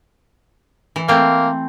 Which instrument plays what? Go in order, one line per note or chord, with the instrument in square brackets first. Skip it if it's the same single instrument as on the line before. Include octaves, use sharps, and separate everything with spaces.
[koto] E3
[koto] A3 C4 [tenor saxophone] A#3